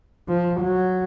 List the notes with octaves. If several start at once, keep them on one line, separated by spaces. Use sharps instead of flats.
F3
F#3